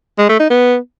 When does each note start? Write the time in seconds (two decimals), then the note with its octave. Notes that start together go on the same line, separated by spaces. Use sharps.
0.18 G#3
0.29 A3
0.40 D#4
0.50 B3